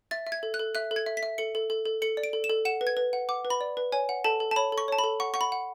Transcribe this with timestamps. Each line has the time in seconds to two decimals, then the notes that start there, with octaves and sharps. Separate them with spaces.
0.11 E5 A6
0.27 E5
0.32 G#6
0.43 A4
0.54 F#6
0.60 A4
0.75 E5 F#6
0.91 A4
0.96 G#6
1.06 E5
1.17 B6
1.23 E5
1.38 A4 C#7
1.55 A4
1.70 A4
1.85 A4
2.02 A4 C#7
2.17 D5
2.24 D7
2.33 A4
2.44 E7
2.50 A4
2.65 F#5 E7
2.81 B4
2.87 G#6
2.97 B4
3.13 F#5
3.29 F#5 D6
3.45 B4
3.50 B5
3.61 D5
3.77 B4
3.92 C#5 G#5
4.09 F#5
4.24 A4 A5
4.40 A4
4.51 A5
4.56 C#5 B5
4.72 A4
4.78 C#6
4.88 C#5 A5
4.99 B5
5.04 A4
5.20 F#5 C#6
5.34 F#5 C#6
5.41 B5
5.52 F#5